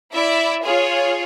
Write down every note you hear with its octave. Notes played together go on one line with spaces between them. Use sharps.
E4 D5 E5
F4 G#4 C#5